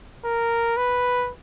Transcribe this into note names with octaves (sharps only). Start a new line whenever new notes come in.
A#4
B4